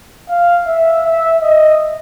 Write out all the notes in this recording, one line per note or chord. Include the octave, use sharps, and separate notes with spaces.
F5
E5
E5
D#5